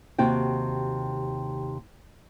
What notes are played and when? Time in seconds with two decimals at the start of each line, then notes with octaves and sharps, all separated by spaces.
0.18 D#2 C3 F#4 G5